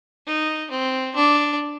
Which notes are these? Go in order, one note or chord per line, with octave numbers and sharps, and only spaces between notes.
D#4
C4
D4